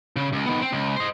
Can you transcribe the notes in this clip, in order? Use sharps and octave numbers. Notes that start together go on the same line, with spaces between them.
C#3
C#2
D#3 B3
C4
C#2
C5 D#5